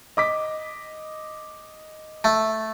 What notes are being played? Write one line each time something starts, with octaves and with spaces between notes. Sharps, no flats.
D#5 D6 B6
A3